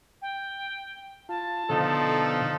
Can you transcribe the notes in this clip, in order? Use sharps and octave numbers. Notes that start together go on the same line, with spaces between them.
G5
F4 A5
B2 D3 F3 D#4 A4